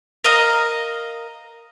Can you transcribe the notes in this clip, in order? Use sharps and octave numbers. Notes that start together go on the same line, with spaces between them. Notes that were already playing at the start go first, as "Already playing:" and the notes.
A#4 D#5 F5 A#5